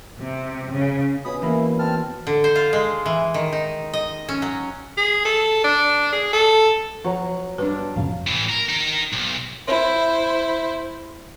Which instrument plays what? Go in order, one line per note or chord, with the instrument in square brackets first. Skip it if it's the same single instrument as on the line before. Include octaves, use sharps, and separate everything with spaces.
[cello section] C3
C#3
[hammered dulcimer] B2 C#4 G#5 [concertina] B5 D#6
[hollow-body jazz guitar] E2 A#3 [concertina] E4
[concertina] C4 A5 F6
[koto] D3
C5
F4
G#3
E3
D#3
D#4
D#5
C#4
F#3
[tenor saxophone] G#4
A4
D4
G#4
A4
[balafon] F3 [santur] F#3 A#5 [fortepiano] F#5
[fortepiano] G2 D4 [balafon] B4
[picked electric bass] F2 A#2 C#3 [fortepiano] F5
[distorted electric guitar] A2 E3
A#4
D#4 A#4
B1
[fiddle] E4 C5